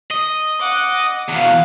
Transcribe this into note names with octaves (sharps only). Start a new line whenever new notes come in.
D#5
F#5 D6
E2 B2 F5 F#5